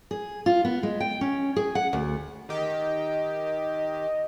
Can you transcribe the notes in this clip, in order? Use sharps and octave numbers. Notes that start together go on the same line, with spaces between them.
G#4
F4
B3
G#3
G5
C#4
G#4
F#5
D2
D#3 G4 D#5